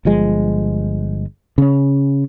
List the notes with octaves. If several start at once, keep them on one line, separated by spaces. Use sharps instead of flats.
G1 F3 G#3
C#3 C#4